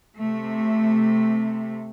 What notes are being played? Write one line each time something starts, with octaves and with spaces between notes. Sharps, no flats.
C3 A3